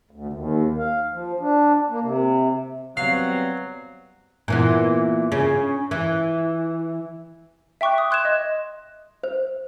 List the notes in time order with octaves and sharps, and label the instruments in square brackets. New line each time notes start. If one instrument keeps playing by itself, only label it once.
[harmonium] D2
D#2
F5
F3
D4
A#3
C3
[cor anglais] F#3 [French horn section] G3 B3 C4 [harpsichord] F5 [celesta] C7
[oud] A#2 E3 B3
C#3
E3
[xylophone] E5 G5 C#6 D6 F#6
D#6
C6 F#6 G#6 E7
D#5
[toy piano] C5